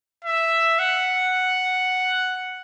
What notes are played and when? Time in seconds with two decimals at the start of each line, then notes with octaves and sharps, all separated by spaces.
0.25 E5
0.79 F#5